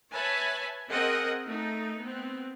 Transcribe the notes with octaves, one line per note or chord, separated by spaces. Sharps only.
B4 C#5 E5 G#5 A5 B5
C4 G#4 A#4 D#5 F#5 G5
A3 D#4
B3 C4